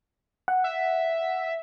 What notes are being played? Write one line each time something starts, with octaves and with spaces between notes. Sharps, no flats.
F#5
E5